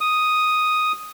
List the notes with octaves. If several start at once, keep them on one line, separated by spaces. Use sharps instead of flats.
D#6